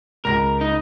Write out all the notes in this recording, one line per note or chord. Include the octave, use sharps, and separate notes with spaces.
C#2 A#4 A#6
D#4